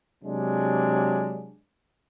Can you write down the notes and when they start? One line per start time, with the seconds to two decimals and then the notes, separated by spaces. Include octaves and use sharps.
0.24 C3 F#3 G#3 D4